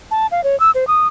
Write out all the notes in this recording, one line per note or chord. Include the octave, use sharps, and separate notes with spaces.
A5
F5
C#5
E6
C5
D#6